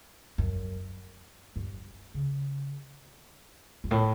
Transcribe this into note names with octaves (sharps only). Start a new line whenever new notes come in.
F#2
G2
C#3
G2
A2